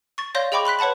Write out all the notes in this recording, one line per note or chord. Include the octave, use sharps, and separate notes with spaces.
C#6 A6
C#5 D5 F5 C6 G6 A#6
G#4 D#5 G5 B5 C#6 D6
B5 C6 F#6 B6
B4 C#5 F#5 A5 B5